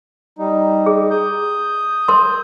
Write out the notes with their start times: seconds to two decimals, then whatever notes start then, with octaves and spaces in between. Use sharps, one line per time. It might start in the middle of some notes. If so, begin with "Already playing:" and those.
0.39 G3 D#4
0.86 G#4
1.11 D#6 G6
2.08 A#4 C6